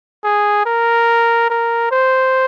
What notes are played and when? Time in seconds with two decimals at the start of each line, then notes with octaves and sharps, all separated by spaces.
0.24 G#4
0.66 A#4
1.50 A#4
1.91 C5